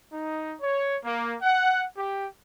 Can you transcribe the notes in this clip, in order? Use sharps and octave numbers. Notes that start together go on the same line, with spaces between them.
D#4
C#5
A#3
F#5
G4